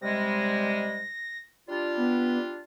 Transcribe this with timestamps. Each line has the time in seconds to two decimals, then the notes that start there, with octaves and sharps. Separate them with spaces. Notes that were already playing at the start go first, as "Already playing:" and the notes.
0.02 C3 G3 G#3 A#6
1.69 G3 D4 F4
1.97 B3